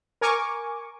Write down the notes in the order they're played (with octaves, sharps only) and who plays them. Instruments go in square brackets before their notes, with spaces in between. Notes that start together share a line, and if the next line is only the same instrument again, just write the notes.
[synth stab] A#4 G#5 C#6 D6